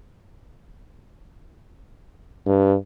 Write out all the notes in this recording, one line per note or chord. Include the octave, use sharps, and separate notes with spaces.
G2